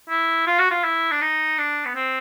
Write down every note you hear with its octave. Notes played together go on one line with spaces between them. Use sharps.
E4
F4
F#4
F4
E4
D4
D#4
D4
B3
C4